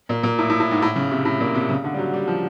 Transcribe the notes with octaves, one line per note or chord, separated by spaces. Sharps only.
A#2
A#2
A2
A2
A2
G#2
A2
C#3
C3
A2
A#2
C3
C#3
D3
G3
F#3
G3
F3